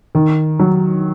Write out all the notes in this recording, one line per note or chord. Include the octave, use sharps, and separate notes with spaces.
D#3
F#3